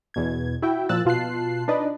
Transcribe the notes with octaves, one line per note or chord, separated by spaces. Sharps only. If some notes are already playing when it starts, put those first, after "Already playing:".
E2 B2 G#6
E4 F#4 E5 G5
A#2 F3 E6 F#6 A6
B2 F4 A5 F#6 C7
D4 D#4 B4 D5 D#5